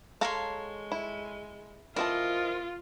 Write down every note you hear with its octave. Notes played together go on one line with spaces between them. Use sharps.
G#3 A4 C#5 F5 A5 A#5 C6
E4
E3 C4 F4 A#4 D#5 A5